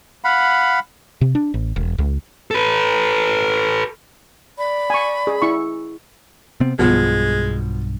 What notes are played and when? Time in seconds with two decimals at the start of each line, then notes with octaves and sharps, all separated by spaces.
0.24 F5 F#5 B5
1.21 C3
1.35 D4
1.54 A1
1.76 E1
1.98 C#2
2.51 A4 B4
4.58 D5 B5
4.90 G#5 C#6
5.27 G#4
5.42 E4 C#6
6.60 C3 B3 C4
6.79 B1 G2 B2 F3 G#3